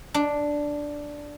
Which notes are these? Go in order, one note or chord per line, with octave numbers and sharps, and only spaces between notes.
D4